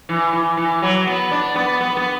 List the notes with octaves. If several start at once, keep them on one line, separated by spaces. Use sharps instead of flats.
E3
E3
E3
F#3
B3
D4
B3
B3
B3